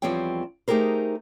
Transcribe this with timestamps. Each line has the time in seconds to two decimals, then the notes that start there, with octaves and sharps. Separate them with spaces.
0.02 E2 F3 G3 C4 C#5 G5
0.68 A3 D#4 G4 G#4 A#4 C5